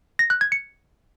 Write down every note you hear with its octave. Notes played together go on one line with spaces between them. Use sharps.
A#6
F#6
G#6
C#7